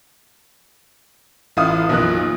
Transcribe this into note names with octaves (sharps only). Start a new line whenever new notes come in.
A1 E4 F5 D#6
B1 F#2 F3 A#3 F#6